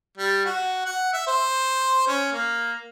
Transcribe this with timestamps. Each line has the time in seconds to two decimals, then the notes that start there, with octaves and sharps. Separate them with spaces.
0.18 G3
0.45 F#4
0.86 F#5
1.13 E5
1.27 C5
2.07 C#4
2.33 A#3